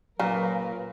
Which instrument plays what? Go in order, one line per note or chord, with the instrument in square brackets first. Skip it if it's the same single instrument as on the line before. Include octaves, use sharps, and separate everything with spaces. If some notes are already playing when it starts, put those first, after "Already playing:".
[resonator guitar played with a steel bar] A#2 [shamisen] C#3 [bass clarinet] F#3 [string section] A#4 B4